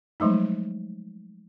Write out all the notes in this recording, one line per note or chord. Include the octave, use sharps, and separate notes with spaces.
F3 F#3 G#3 A3 D#4